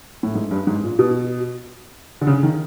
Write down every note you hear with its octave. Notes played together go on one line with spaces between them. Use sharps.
A2
G#2
G2
G#2
A#2
B2
D3
C#3
D#3